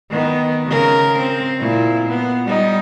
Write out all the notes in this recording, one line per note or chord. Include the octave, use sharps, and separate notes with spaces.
D#3 B3
C#3 A#4
C4
A#2 E4
B3
G3 D#4